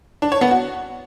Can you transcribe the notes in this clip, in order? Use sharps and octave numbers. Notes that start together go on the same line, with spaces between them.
D4
C#5
B3
F#4